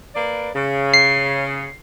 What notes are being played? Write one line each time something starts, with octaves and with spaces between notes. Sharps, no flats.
A#3 B4 D5
C#3
C7